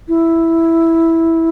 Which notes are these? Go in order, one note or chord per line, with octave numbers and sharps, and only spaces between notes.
E4